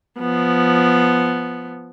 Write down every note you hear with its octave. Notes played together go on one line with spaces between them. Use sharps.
F3 B3